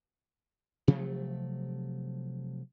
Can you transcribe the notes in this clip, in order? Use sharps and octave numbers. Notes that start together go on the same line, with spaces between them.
C3 F3 F#3 A3